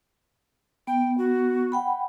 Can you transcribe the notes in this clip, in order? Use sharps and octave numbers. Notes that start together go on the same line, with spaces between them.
B3 G5
F#4
F#5 G5 B5